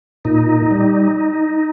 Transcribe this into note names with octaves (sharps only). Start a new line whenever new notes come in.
A#2 D#4
G3